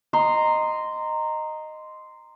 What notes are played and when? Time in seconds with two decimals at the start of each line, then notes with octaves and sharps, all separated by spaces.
0.13 D#5 A#5 C6